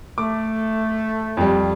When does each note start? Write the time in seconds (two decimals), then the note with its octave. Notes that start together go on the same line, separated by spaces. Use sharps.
0.18 A3 D6
1.37 F2 G3